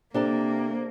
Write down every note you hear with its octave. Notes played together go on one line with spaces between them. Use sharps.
C3 A#3 D4 A4 A#4